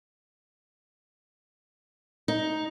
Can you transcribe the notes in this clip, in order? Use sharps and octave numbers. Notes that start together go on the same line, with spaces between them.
D#4